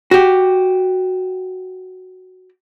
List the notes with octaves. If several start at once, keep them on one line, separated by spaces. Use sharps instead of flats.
F#4 G4